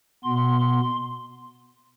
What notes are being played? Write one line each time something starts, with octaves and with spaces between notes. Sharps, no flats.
B2 B3 C6